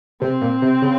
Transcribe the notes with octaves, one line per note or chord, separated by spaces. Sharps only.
C3 C4
A#2
C3
C#3